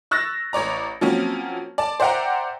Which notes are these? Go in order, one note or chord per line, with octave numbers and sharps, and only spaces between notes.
C#6 E6 F#6 A6 A#6
A1 C#5 D5 A#5
F3 F#3 A#3 C4 C#4
D5 A5
C5 D5 E5 F#5 G5 A#5